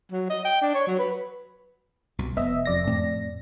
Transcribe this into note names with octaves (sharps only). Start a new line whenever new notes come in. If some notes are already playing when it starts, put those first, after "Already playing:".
F#3
D#5
G5
D4
C#5
F#3
B4
C2 B2
F1 B3 D#5 E5
F2 D5 A#6
A2 A3 C4